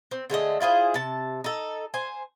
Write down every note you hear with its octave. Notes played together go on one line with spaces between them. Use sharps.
C4
D3 G#3 A3 D#5
E4 F4 G#4 C5
C3 A5
D#4 A4
C5 G#5